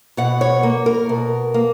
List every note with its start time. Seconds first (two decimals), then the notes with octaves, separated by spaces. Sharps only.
0.17 B2 F#5
0.41 C#5
0.63 A#3
0.86 A#4
1.09 B2
1.54 A#3